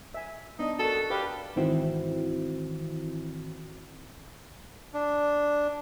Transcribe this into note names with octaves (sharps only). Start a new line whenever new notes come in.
E5 G#5
B3 D4 D#4 D#5
F#4 A4 A#4
G4 B4 D5 F5
G#2 D#3 E3 C4 E4 F#4
D4